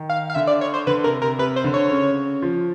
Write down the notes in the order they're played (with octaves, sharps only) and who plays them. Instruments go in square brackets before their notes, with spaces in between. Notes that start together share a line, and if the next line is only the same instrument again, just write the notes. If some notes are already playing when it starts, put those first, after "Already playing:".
Already playing: [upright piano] D#3
[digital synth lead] F5
F5
[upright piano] D3 [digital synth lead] E5
[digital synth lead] D5
C#5
C5
[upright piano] D3 [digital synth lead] B4
[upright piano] C3 [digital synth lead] A#4
[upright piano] C3 [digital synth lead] A#4
[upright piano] C3 [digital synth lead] B4
[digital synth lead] C5
[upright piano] D3
[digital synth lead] C#5
[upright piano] C#3
F3